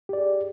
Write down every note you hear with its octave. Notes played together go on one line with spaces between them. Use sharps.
G4 G#4 D5